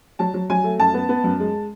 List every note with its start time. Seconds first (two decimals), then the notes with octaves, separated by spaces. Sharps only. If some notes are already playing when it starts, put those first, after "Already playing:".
0.19 F#3 A5
0.34 F#3
0.50 F#3 G#5
0.64 A3
0.79 F#2 A5
0.94 B3
1.09 B3
1.24 F#2
1.40 G#3